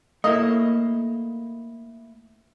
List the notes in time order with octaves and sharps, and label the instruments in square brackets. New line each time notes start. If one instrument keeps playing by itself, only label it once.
[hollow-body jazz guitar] A3 A#3 E4 [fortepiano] D#5